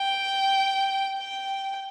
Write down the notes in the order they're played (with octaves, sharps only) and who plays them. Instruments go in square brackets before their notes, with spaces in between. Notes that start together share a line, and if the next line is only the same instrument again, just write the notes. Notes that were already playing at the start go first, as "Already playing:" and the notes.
Already playing: [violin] G5
G5